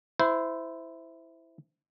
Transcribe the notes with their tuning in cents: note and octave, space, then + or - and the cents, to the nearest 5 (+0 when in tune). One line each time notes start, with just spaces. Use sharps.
E4 +0 C5 -20